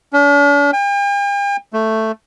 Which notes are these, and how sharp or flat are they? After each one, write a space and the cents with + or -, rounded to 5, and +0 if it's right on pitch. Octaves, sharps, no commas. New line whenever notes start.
D4 -45
G5 +45
A3 +5